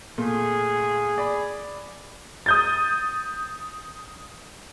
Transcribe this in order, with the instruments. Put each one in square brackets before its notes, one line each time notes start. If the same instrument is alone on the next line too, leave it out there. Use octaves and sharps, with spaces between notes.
[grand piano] A#2 A3 [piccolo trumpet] G#4
[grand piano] D5 B5
[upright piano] D#6 G6 A6